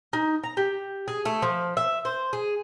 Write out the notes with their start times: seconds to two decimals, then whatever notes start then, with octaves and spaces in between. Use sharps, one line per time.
0.13 D#4
0.44 A#5
0.57 G4
1.08 G#4
1.25 A3
1.42 F3
1.77 E5
2.05 C5
2.33 G#4